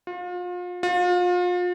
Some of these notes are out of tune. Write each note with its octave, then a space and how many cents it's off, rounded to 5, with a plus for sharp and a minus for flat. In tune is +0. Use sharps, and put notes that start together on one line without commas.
F4 +35
F4 +35